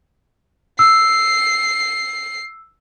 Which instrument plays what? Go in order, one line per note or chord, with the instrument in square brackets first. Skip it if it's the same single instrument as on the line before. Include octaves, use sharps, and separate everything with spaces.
[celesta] E6 [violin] C7